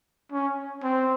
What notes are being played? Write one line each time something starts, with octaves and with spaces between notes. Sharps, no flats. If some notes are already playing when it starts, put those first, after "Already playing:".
C#4
C4